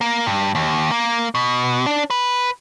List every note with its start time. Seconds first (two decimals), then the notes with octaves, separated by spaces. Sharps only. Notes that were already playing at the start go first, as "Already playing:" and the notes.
0.01 A#3
0.26 G2
0.55 D#2
0.91 A#3
1.35 B2
1.86 D4
2.10 B4